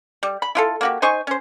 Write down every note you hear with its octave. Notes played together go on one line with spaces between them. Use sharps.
G3
B5
E4 F4 A4
A#3 F#4 G4
D#4 C5 G#5 C#6
C#4 C5